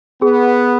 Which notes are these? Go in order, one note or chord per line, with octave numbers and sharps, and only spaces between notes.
B3 G#4